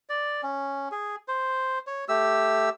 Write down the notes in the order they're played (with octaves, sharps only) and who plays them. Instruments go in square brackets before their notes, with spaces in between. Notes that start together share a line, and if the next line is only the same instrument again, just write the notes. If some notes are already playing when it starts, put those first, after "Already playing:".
[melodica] D5
C#4
G#4
C5
C#5
A3 G4 E6